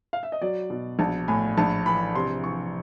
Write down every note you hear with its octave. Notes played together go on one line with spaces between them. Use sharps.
F5
E5
D#5
F#3 D5
B2
A#1 A5
A2 G#5
A#1 A5
E3 B5
C3 C6
E3 C#6